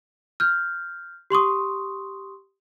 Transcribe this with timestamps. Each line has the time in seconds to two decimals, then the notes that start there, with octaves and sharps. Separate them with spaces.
0.40 F6 G6
1.30 G4 C6 C#6 D#6